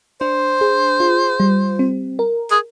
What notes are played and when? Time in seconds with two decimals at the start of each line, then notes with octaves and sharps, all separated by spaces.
0.21 D4 C5
0.61 G#4
1.00 F4
1.40 G3
1.79 C4
2.19 A#4
2.51 G#4